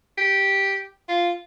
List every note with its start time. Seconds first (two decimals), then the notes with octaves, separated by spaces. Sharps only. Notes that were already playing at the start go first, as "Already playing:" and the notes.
0.17 G4
1.08 F4